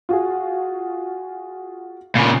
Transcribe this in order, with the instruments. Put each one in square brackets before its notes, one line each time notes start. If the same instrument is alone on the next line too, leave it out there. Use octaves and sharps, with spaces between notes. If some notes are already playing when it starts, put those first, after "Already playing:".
[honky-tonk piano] F4 F#4 G#4
[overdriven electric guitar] A#2 C#3